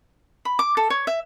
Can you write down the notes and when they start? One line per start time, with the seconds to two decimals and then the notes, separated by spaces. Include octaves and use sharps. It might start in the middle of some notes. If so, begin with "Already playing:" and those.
0.45 B5
0.59 D6
0.77 A4
0.90 C#5
1.07 E5